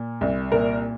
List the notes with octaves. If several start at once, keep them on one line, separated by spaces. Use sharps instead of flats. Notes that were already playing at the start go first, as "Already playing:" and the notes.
Already playing: A#2
C2
A#2 A#4